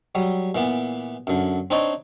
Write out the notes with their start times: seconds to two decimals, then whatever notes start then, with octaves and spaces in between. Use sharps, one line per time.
0.15 F#3 G3
0.55 A#2 E3 B3
1.27 F#2 D3
1.70 C4 D4 D#4 C#5